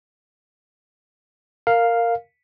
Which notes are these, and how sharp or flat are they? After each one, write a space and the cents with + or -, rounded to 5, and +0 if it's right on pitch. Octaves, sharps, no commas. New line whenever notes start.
A#4 -10 F5 +0